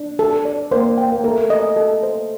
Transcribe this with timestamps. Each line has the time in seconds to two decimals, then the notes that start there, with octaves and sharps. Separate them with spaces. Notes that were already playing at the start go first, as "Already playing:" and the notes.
Already playing: D4
0.19 A4
0.45 D5
0.71 A#3 C5
0.98 G5
1.12 A#3
1.24 A3 A#4
1.50 D#5
1.76 A4
2.03 C5